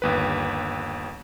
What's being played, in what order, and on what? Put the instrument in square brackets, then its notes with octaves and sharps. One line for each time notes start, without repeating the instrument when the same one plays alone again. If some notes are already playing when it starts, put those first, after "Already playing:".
[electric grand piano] G1 D#2 B4